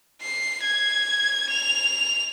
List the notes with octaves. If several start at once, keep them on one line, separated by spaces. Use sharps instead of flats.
C7
G#6
F7